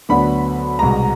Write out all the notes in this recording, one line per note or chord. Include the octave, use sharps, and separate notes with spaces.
D2 D3 F#3 B3 D4 B5
C2 B2 G#3 A#5